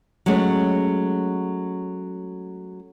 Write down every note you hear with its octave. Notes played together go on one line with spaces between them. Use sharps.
F#3 G#3 A3 C#4